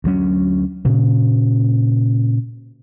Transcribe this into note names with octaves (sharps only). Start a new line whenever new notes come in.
D2 F#3 C#4
A#2 C#3